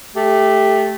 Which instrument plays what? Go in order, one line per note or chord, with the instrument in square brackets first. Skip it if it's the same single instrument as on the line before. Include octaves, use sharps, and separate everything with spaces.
[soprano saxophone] A3 [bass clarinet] G4